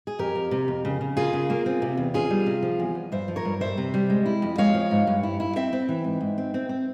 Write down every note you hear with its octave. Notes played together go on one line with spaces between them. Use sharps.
G#4
F2 G4 A#4
F2
C3
F2
C#3
C#3
A#3 F4 G#4
C#3
A#3
C4
C3
E2
C#4 F4 G#4
G3
C3
F3
E2
E2
G2 C5 E5
F3
A#4 C#5
G2
G3 C5 E5
C3
G3
G#3
E4
F2
G#3 C#5 F5
F3
G#2
G2
E4
E4
C4 E5 G5
C4
E3
G#2
G#2
C4
C4
C4